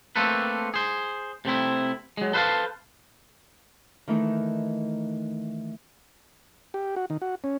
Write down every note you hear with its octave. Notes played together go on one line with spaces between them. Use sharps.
A3 A#3 C4 A4 B4
G#4 C5
C3 A3 C4 E4
F#3 G#3
A4 B4 C5 E5 F5 A5
D#3 E3 A3 D#4
G4
F#4
D#3
F#4
C#4